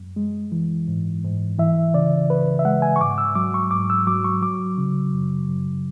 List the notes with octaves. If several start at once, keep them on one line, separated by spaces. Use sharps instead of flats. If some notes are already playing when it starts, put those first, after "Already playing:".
Already playing: F#2
G#3
E3
G#2
G#2
E3 E5
C#3 D5
C#2 B4
E5
G#3 F#5
G#5
C#6
G#2 D6
E6
F#3 D6
C#6
G#2 D6
E6
F#3 D6
C#6
F#3 D6
C#3
F#2
F#2